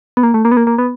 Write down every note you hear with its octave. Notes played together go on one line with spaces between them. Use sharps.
B3
A#3
A3
A#3
B3
A#3
A#3
B3